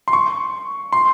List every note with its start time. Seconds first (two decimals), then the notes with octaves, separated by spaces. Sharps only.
0.08 C6
0.13 C#6
0.93 C6